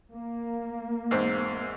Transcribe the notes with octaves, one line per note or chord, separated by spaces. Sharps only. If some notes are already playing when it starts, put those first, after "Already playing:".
A#3
E2 G#2 C4